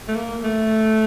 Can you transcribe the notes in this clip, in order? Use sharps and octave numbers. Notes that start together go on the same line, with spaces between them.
A3
A#3
A3